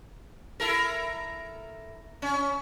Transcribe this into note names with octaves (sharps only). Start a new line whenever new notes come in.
E4 A4 A#4
C#4